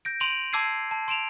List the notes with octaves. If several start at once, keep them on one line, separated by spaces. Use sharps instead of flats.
G6 A#6 D7
C6 D7 D#7 F7 F#7
A5 D6 E6 G#6 C7 D#7
A5
C6 D7 E7 F7